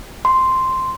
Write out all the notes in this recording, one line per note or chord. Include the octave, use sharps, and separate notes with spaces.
C6